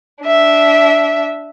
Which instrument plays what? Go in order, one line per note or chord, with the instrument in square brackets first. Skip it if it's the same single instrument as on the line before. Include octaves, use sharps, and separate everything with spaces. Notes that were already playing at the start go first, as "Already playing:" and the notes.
[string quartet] D4 E5